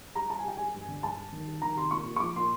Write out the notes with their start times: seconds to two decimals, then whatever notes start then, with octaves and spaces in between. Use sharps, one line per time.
0.15 G3 A#5
0.30 G3 A5
0.39 G#5
0.45 G3 G5
0.57 G3 G#5
0.74 G2
0.88 D3
1.03 G2 A5
1.18 G3
1.33 D#3
1.47 G3
1.62 D#3 A#5
1.76 C3 C6
1.91 A#2 C#6
2.06 A#2
2.16 C#6
2.20 F3 D6
2.36 A#2 C6